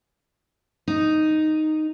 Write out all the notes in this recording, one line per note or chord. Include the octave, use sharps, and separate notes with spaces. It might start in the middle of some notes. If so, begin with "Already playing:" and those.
D#4